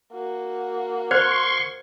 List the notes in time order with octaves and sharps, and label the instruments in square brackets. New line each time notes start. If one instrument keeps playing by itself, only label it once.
[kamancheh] A#3 F#4
[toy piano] C5 [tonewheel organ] C6 C#6 [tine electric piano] F6 G#6